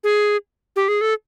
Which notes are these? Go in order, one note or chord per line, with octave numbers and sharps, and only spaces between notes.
G#4
G4
G#4
A4